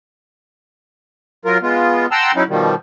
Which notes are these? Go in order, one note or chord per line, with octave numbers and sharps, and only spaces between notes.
F#3 F4 A#4
G#3 B3 F4
F#5 G5 A5 A#5 C6 E6
F#3 C#4 D#4 E4
B2 D#3 F3 G3